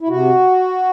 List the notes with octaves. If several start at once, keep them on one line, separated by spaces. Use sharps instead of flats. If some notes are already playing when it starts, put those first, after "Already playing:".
E4
C3 F#4